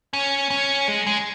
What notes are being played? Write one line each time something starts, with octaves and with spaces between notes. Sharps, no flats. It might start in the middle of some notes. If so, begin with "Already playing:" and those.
C#4
C#4
G#3
G#3